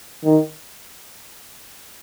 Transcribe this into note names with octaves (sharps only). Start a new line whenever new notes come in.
D#3